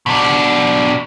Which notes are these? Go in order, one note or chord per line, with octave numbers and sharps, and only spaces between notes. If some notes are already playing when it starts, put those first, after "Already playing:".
B2 D4